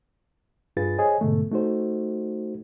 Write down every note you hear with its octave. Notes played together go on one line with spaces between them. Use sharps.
G2 D4 F4 G#4 B4 A6
G#4 C5 C#5 D#5 G#5
G#2 B2 D3 A3
A3 D#4 F#4 C5